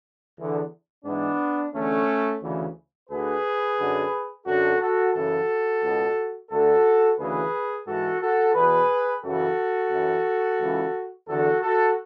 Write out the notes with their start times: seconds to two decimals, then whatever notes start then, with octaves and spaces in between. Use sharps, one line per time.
0.38 E2 D3
1.05 G#2 E3 B3 D4
1.73 E2 D3 A3 C#4
2.42 D2 C#3 E3
3.09 D2 D3 G#4 B4
3.77 F#2 D3
4.45 F#2 D3 F#4 A4
4.80 F#4 A4
5.14 F#2 C#3 E3 F#4 A4
5.82 C#2 B2
6.50 D2 D3 F#4 A4
7.18 D2 C#3 E3 G#4 B4
7.86 G#2 E3 F#4 A4
8.21 F#4 A4
8.55 E2 B2 G#4 B4
9.23 F#2 C#3 E3 F#4 A4
9.91 F#2 E3
10.59 C#2 C#3 E3
11.27 E2 D3 F#4 A4
11.61 F#4 A4